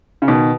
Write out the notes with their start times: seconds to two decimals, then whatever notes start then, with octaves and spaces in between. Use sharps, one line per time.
0.22 C#3
0.27 B2 D#3